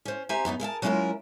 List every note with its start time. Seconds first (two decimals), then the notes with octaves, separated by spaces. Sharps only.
0.05 C#4 C5
0.29 C4 G4 C5 E5 G#5 A#5
0.45 F#2 B3 D4 D#4
0.60 G#4 A#4 E5 A5
0.82 F#3 G#3 C#4 E4 F4 A#4